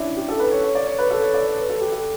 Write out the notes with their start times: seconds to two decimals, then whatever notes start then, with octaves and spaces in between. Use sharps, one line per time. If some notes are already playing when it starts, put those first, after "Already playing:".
Already playing: C#4 D4 E4
0.16 G4
0.29 A4
0.40 B4
0.52 C#5
0.64 C#5
0.75 D5
0.87 C#5
0.99 B4
1.11 A4
1.22 C#5
1.34 D5
1.46 C#5
1.58 B4
1.70 A4
1.81 G4
1.92 A4